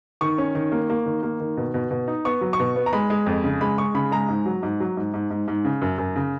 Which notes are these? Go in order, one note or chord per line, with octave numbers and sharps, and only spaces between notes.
D#3 C#6
C#4
D#3
A#3
A#3
D#3
A#3
D#3
B2
B2
B2
D#4
B3 C#6
F#3
C#6
B2
B3
A#5
G#3 B5
G#3
F2
C#3
G#3 B5
G#3 C#6
C#3 B5
G#3 A#5
G#2
F#3
G#2
F#3
G#2
G#2
G#2
G#2
C#3
F#2
F#2
C#3